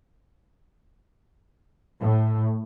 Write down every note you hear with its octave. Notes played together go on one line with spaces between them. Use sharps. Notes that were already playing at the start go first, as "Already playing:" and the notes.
A2